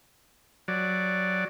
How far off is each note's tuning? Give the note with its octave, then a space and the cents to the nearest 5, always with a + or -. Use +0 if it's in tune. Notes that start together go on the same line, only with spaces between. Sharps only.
F#3 +0 D5 +0